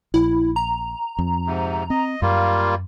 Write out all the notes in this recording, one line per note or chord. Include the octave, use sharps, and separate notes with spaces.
A#1 E4
A#5
F2
G#2 C3
C4 D#5
F#2 G3 A#3 F4